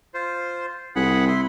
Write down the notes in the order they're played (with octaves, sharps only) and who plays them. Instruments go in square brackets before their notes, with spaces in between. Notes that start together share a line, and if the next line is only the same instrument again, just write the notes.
[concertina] F4 C5
[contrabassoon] C2 [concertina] G#4 F#5 B5
[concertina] E4 B5 C6